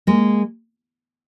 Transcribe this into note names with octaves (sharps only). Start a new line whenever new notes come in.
G#3 A#3